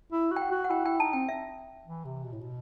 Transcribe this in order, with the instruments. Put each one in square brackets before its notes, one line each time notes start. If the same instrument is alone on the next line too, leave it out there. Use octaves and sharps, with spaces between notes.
[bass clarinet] E4
[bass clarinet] F#4 [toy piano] G5
[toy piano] F#5
[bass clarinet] F#4
[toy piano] F#5
[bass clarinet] E4 [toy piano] G5
[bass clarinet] E4 [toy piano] G5
[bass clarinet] D#4 [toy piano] A5
[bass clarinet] C4 [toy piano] G5
[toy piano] E5
[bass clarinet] E3
C3
B2
A2
B2